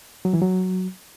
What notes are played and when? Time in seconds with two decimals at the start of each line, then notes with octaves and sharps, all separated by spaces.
0.25 F#3
0.33 E3
0.42 F#3